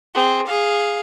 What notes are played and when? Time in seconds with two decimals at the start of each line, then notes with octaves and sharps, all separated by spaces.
0.15 C4 G#4
0.47 G#4 F5